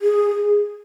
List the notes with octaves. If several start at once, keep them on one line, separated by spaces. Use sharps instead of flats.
G#4